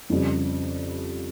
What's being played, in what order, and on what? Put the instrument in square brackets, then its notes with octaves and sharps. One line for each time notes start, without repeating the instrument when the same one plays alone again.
[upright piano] F2 C#3 G3